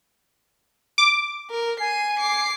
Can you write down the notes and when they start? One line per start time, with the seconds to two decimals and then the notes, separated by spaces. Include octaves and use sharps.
0.98 D6
1.51 A#4
1.80 G#5 C7 D#7
2.19 D6 C7